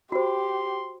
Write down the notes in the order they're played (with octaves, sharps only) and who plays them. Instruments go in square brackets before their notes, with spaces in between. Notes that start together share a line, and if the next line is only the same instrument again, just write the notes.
[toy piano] F#4 C5 [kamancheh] G4 [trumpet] C6